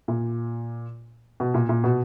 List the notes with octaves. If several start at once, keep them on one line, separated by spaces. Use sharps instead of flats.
A#2
B2
A#2
A#2
B2